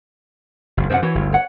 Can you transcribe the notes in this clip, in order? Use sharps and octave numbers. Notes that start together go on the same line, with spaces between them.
F#1 D2
F#2 C3 C5 E5 F#5
E3 E4 F#4 C#5
G1 D2
C#5 F#5